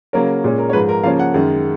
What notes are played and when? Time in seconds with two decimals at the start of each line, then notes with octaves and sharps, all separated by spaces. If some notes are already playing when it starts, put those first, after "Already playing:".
0.13 C#3 F#3 A#3 C#4 A#4
0.44 A#2 G#3 C#4
0.58 A#4
0.69 C#5
0.73 G#2 F3 G#3 B4
0.89 A#4
1.03 C#3 F3 A#3 C#4 F5
1.19 F#5
1.34 F#2 D#3 G#3